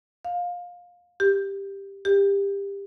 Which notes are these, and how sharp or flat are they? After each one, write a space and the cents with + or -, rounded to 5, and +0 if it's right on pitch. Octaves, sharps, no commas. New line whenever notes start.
F5 +20
G4 +10
G4 +25